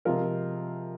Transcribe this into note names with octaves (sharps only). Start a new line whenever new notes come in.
C3 F3 G#3 F4 A#4